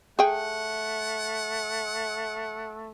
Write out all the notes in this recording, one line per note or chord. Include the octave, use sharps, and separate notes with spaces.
A3 G#4 F#5 G5